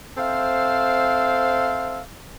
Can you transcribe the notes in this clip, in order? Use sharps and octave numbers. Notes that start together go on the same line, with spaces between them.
C4 A4 C5 E5 F5